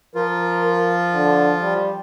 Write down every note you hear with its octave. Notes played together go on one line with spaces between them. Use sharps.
F3 F4 A#4
D3
G3